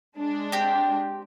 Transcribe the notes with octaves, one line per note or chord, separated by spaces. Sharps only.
G#3 D4
C4 G4